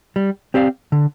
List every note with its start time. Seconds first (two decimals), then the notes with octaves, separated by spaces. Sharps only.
0.16 G3
0.54 C4 G4 D5 F5
0.92 D3